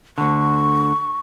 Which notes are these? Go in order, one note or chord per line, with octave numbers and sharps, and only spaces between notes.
D2 D3 C#6